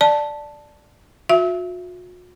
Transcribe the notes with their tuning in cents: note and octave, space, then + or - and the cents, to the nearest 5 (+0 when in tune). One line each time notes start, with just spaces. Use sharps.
D5 +5 A5 +0
F#4 -45 E5 +20